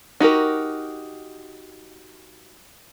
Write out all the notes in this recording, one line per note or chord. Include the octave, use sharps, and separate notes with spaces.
D#4 F#4 G4 A#4